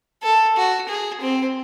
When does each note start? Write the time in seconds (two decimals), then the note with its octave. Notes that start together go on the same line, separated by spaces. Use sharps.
0.23 A4
0.57 F#4
0.89 G#4
1.21 C4